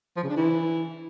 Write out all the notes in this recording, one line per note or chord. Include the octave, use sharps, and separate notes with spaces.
F3
C#3
D4
E3